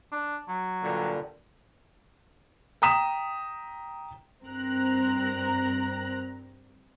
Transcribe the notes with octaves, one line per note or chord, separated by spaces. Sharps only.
D4
F#3
G2 A#2 D3
G5 A#5 D#6 B6 E7
G2 C4 A#4 A#5 F#6